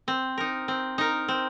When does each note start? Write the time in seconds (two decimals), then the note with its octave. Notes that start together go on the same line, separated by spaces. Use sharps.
0.08 C4
0.38 D#4 A#4
0.68 C4
0.98 D#4 A#4
1.28 C4